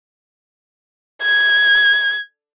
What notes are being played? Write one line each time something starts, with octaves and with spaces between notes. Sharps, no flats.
G#6